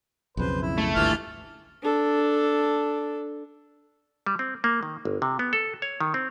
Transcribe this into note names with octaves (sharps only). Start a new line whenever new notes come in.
B1 F2 C#3 B4 C5
E4
A3
G#1 D2 G2 E3 F4 F6
D4 A4
G3
C4
A#3
D#3
G1
C3
B3
A4
C#5
D#3
C4